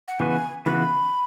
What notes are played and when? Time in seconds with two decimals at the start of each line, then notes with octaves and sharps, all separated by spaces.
0.08 F#5
0.19 C#3 E3 B3 F#4 B4 G#5
0.66 C#3 E3 B3 F#4 B4 B5